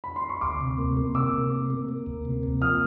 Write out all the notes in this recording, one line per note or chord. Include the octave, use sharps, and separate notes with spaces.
B5
C6
C#6
D2 C6 D6
C3
A#3
A#3
C3 D6 E6
C3
A#3
A#3
A#3
D2
C3
A#3
F3 D#6 F6